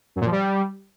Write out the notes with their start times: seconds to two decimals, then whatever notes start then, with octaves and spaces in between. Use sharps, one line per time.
0.16 F#2
0.21 A#2
0.26 F3
0.32 G3